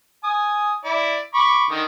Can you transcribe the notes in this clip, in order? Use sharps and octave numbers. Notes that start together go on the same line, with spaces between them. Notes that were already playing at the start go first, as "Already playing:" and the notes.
G#5 D#6
E4 D5
B5 C#6 D6
D3 D#3 D#6